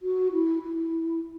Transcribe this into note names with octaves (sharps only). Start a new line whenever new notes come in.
F#4
E4
E4